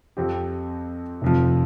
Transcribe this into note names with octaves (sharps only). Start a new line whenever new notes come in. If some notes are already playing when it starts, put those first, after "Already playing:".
F2 F3 C4 G4
F1 F2 F3